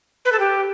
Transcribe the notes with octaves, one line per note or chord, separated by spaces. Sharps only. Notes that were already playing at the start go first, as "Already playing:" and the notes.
B4
A4
G4